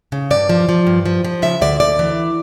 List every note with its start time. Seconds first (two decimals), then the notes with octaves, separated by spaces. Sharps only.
0.12 C#3
0.30 G2 D5
0.49 F3
0.69 F3
0.87 G2
1.06 F3
1.24 F3
1.42 C#3 E5
1.61 D2 D5
1.80 D2 D5
1.99 E3